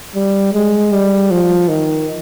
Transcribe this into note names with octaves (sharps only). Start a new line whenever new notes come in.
G3
G#3
G3
F3
D#3